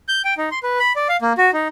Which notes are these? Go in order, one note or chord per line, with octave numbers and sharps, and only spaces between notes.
G6
G5
D#4
C6
B4
B5
D5
F5
A#3
F#4
D#4